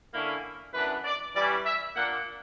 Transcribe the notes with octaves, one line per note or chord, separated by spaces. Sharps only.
D3 A#3 C#4 E4
F#2 E3 B3 D4 B4
D5
E3 G3 C#4 E4 D5
E5
A#2 A#3 D4 F#5